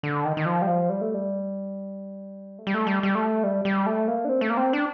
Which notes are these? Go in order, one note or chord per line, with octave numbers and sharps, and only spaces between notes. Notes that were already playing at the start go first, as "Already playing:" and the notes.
D3
D#3
D#3
F3
G3
F3
G3
A3
G3
A3
G3
A3
G3
G3
A3
G3
G3
A3
A#3
D4
C4
A3
A#3
C4
D4